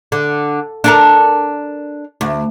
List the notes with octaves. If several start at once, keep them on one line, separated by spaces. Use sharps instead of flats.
D3
D4 A4 A#4
D2